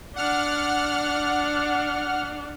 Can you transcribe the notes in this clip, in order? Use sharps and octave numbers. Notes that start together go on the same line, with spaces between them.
D4 F#5 F6